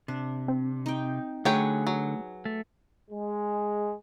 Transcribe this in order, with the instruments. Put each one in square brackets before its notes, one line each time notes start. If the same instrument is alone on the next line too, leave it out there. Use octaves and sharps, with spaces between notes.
[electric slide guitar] C3 [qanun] D4
[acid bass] C4
[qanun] D#4 G5
[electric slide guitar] D3 [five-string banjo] F#3 C#5 G5 [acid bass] A3 [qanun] G#4 B4
[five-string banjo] F#3
[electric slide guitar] A3
[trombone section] G#3